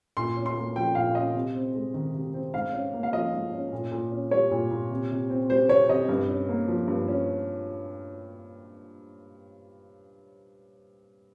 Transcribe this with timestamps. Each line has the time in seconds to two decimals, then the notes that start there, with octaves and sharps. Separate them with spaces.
0.17 A#2 C6
0.37 C#4
0.46 C6
0.56 A#3
0.76 F3 G5
0.95 A#2 F5
1.15 C#4 D#5
1.34 C3
1.55 C4
1.75 G#3
1.94 D#3
2.14 C3
2.34 C4
2.54 G#2 F5
2.73 C#4
2.94 A#3
3.03 F5
3.13 F3 D#5
3.32 G#2
3.53 C#4
3.72 A#2
3.92 A#2
4.12 C#4
4.31 G3 C#5
4.51 A#2
4.71 A#2
4.91 C3
5.11 C3
5.30 C4
5.50 G3 C5
5.69 C3 C#5
5.89 C3 D#5
6.09 G2
6.29 C#4
6.49 A#3
6.68 F3
6.88 G2
7.08 C#4